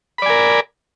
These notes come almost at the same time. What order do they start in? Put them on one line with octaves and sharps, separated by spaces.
B5 D5 G#5 A#4